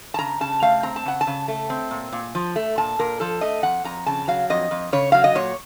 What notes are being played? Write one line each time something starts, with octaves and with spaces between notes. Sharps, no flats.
A5
C#3 A#5
C#3 A5
A3 F5
C4 A#5
A5
C#3 F#5
A5
C#3
A3
C4
A#2
A#2
F3
A3
A#2 A5
A#2 A#4
F3 A4
A3 D#5
F2 F#5
F2 A#5
C#3 A5
F#3 F5
F2 D#5
F2
C#3 C#5
F#3 F5
D#5
A#2 C#5